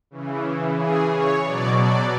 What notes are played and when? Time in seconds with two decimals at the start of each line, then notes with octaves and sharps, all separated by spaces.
0.11 C#3 E3
0.77 G#4
1.11 C#5
1.44 B2 F#3 D5
1.78 D5